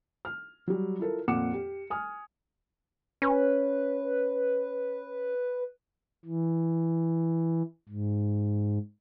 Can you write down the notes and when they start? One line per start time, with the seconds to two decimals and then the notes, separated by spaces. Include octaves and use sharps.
0.25 F6
0.68 F#3 G3
0.99 E4 F4 A4 A#4
1.28 F2 A#2 F#5 D6 C#7 E7
1.54 G4
1.90 G#5 D#6 F6
3.22 C#4 B4
6.25 E3
7.89 G#2